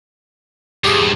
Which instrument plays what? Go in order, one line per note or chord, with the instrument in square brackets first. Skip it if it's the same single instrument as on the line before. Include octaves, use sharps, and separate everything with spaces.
[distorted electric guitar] E2 G2 [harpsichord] G4 G#4